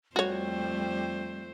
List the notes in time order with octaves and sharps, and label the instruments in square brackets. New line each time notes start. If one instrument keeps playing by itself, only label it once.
[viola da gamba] F2 A3 C5 [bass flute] G3 [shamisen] F#4 C#5